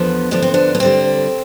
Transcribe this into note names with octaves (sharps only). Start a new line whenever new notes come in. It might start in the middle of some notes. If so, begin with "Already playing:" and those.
Already playing: E2 D3 F3 B3
E2 D3 F3 B3 D4
C4
B3 D4
B3
D3 G3 C4